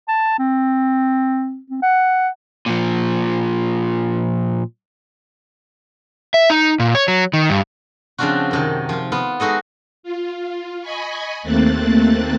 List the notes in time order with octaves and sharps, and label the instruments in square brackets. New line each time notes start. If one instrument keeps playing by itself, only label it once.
[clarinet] A5
C4
C4
F#5
[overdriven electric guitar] A#2 F3
[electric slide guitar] E5
D#4
A#2
C#5
F#3
D#3
G2
[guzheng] C#3 F3 C4 D4 F4 F#4
F#2 C3 D#3
F3 F4
B3 F4
G#3 D#4 F#4 A4 D#5
[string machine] F4
D#5 G#5 B5 C#6
D#2 A3 A#3 C4 F#6 A6